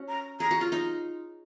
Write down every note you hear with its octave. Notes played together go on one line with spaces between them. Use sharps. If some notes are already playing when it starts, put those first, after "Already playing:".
Already playing: C#4 F#4
A#5
G#4 A#5
F#4
F4
D#4